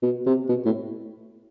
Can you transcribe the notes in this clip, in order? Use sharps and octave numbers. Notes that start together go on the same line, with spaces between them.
B2
C3
B2
A2